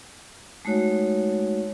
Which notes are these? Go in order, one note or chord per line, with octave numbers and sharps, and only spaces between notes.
G#3 A3 D#4 F#4 C#5 F#5